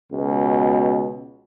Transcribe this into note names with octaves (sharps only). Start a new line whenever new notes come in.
C#2 B2